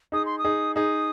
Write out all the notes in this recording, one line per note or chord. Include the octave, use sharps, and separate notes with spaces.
D#4 G#4 D#6
C6
D#6
D#4 G#4
D#4 G#4 D#6